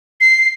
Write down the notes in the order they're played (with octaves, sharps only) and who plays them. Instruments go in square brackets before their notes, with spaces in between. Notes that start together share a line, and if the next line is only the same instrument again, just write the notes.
[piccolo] C7